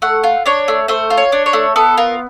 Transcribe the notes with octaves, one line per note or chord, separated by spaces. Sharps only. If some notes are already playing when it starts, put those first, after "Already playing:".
A3 F#5
F4
D4 C#5
A3
A3 C5
F4
C#5
D4
C#5
A3
B3 A4
F4 A#4